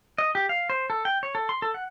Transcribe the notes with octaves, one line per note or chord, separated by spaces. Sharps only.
D#5
G4
F5
C5
A4
G5
C#5
A4
C6
A4
F#5